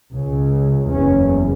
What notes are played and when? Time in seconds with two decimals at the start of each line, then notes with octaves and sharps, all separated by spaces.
0.13 C#2 C#3
0.91 F#1 E2 C#4